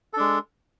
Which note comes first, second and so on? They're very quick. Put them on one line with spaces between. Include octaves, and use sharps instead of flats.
A4 D4 G#3